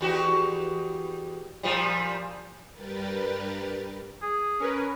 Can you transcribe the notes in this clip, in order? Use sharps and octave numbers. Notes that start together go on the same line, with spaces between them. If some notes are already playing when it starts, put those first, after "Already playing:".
E2 F#4 G4
A#2 F3 G3
G2 G3 G4 A#4 B4 A6
G#4
C#4 A#4 B4